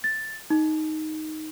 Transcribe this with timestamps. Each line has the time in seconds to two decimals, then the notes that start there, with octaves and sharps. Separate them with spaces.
0.04 A6
0.50 D#4